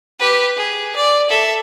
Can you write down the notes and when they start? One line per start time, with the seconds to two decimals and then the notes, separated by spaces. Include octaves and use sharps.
0.19 G4 B4
0.56 G#4
0.95 D5
1.29 A4 E5